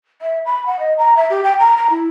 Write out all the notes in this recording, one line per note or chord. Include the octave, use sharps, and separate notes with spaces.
E5
B5
F#5
D#5
A#5
E5
G4
G5
A#5
A#5
E4